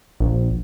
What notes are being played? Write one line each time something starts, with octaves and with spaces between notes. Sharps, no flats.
A#1